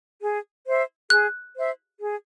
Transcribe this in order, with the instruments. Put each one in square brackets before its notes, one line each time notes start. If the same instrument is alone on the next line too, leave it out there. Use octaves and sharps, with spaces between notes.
[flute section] G#4
C5 E5
[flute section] G#4 [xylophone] F#6
[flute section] C5 E5
G#4